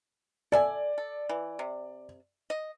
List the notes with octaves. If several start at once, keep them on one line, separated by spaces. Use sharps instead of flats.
A4 D5 E5 G#5
A4
E3
C3
D#5